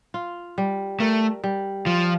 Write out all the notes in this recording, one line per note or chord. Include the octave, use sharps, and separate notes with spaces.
F4
G3
A3 A#4
G3
F3 F4